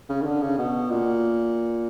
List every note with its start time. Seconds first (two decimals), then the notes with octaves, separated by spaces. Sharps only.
0.09 C#3
0.21 D#3
0.25 D3
0.42 C#3
0.58 B2
0.90 A#2